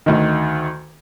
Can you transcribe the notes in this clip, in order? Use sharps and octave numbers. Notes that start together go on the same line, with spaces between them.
D2 D#3